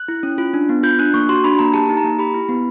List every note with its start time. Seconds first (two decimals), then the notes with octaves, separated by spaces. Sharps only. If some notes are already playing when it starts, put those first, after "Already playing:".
Already playing: F#6
0.08 E4
0.23 C#4
0.38 F4
0.54 D4
0.69 B3
0.83 F4 G6
0.99 D4 F#6
1.14 A#3 C#6
1.29 F#4 C6
1.44 D4 B5
1.59 A#3 A#5
1.74 G4 A5
1.89 D#4
1.97 A#5
2.04 A#3
2.19 G4 B5
2.34 E4
2.49 B3